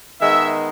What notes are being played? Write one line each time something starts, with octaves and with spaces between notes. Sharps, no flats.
D#3 G#3 B3 E5